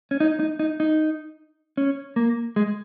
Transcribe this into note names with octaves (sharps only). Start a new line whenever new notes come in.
C#4
D#4
D#4
D#4
D#4
C#4
A#3
G#3